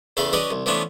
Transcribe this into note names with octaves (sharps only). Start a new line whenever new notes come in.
E2 C#3 A4 E5 F5 B5
C#4 F#4 B4 D5 D#5
C2
E3 F3 A3 B3 C#4 D4